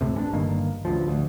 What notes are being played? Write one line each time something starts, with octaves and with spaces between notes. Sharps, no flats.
C#2 A2 C3
A1 C#4 D4
G1 G2 D#3 A#3
A1 D2 F3
D2